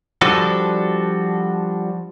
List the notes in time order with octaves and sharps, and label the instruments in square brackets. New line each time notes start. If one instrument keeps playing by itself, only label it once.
[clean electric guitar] F3 G3 D4 F#4 A4